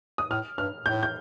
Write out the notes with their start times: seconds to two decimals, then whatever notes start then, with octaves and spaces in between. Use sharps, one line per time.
0.18 D#6
0.30 A2 F6
0.58 G2 F6
0.86 A2 G6
1.03 G6